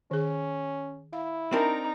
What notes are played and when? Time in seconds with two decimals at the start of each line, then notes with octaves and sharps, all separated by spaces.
0.11 D#3 C#4 G#4
1.13 E4 F5
1.53 C4 D4 D#4 A#4 A#5